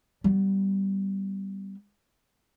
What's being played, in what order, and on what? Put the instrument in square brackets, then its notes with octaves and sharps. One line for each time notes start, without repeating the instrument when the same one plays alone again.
[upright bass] G3 B3